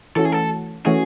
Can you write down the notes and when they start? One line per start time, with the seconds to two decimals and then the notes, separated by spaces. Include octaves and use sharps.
0.16 E3 A3 C#4 F#4 A4
0.25 G#4
0.32 A4
0.86 E3 A3 C#4 F#4 G#4